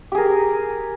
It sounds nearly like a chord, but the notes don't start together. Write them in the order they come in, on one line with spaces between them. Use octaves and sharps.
G4 G#4 A#4